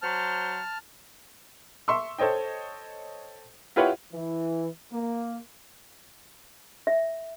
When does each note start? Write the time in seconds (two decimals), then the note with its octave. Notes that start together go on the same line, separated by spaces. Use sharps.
0.02 F#3 C5 A5 F6
1.88 E5 C6 C#6 E6
2.18 A4 C5 C#5 D#5 G5
3.76 E4 F4 G4 B4 C#5 F#5
4.13 E3
4.92 A#3
6.87 E5